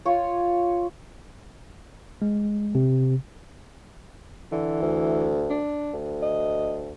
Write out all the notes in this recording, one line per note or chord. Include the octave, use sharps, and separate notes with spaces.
F4 C#5
G#3
C3
D3 E3
D2
D4
D2
D#5